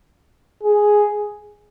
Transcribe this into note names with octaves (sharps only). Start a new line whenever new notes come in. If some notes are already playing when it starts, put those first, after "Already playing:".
G#4